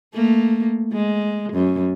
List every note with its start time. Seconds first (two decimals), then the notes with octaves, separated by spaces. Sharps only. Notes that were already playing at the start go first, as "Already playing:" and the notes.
0.14 A3 A#3
0.92 G#3
1.53 F#2